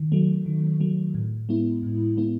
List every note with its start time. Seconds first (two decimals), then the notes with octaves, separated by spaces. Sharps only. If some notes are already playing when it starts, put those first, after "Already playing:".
Already playing: D#3
0.12 F#3 A3
0.46 D#3
0.80 F#3 A3
1.15 A2
1.49 G#3 B3 E4
1.83 A2
2.17 G#3 B3 E4